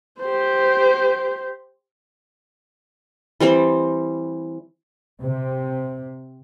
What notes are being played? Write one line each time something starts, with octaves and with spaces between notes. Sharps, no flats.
G4 C5
E3 G3 C4 C5
C3